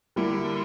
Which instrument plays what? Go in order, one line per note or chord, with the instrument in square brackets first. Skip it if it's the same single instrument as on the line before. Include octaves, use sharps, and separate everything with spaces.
[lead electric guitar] D3 [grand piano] G3 A#3 E4